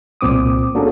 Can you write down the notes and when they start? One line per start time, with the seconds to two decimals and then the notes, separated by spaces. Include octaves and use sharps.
0.21 C2 A#2 C4 D6 D#6
0.75 A#3 C#4 D4 F#4 G#4 A4